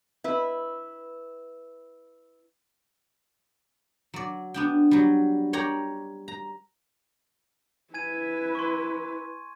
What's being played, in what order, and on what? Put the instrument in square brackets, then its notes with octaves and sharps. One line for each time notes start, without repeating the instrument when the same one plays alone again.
[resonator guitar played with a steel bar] E4 B4
[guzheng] F#3 D5
B3 D4 G5
F#3 G3
C#5 D5 G5 A#5
A#5
[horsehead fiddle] E4 B4 [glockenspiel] G#5 G#6 D#7
[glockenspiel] C6 C#6